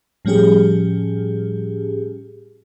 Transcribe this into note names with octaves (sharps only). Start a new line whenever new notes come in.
A2 F3 G3 C#4 G4 G#4